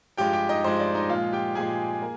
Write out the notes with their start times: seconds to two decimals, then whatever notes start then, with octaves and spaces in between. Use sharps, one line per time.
0.18 G2 F3 G#3 G4 G5
0.33 G4 G5
0.49 D#4 D#5
0.64 G2 F3 G#3 C5
0.80 D5
0.94 D#4 D#5
1.09 A#2 F3 G#3 F4 F5
1.33 G4 G5
1.55 A#2 F3 G#3 G#4 G#5
2.02 A#3